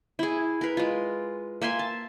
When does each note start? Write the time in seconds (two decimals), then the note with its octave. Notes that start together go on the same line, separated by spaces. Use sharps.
0.19 E4 G#4
0.61 A#4 B4
0.77 G#3 F4
1.62 A#3 E5 G#5 C6
1.79 A5